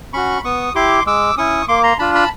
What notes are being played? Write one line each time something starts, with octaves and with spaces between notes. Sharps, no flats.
C#4 F#4 B5 C#6
B3 C#6 D#6
E4 G4 C6 D6
G#3 D6 E6
C#4 E4 C#6 D#6
A#3 C6 D6
A#5 C6
D4 F4 A5 B5
A5 B5